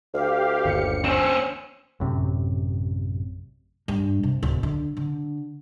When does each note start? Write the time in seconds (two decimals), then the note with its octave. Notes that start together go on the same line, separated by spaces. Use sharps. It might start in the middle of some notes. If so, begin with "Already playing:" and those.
0.14 D2 G4 F5
0.65 G1 D#2 C#7
1.04 C4 C#4
2.00 A1 F#2 C3
3.88 G2
4.23 C3
4.43 D1
4.63 D3
4.97 D3